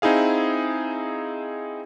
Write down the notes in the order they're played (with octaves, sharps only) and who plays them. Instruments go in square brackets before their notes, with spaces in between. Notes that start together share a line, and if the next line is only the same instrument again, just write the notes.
[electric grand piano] C4 D#4 E4 G#4 F5